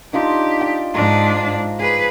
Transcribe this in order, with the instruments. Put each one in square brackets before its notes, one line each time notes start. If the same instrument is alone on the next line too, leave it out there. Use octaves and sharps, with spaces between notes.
[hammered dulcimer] D4 D#4 F4 [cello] G4
[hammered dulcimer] D5 D#5 G5
[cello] G#2 D4 [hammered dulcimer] C5 D#5 A#5
[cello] G#4 B4 [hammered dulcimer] D6